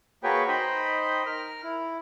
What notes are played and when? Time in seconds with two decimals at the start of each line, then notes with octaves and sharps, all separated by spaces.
0.23 A#3 F#4 G#4 B4 C#5 G5
0.48 D#4 C5 D#5 G5 B5
1.26 A#4 F6
1.63 E4